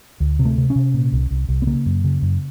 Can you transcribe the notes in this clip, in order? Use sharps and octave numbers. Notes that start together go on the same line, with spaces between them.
D2
C3
A3
C3
C#4
C3
A#2
C2
C2
C2
B3
C#3 A#3
F#2
C#3
F#2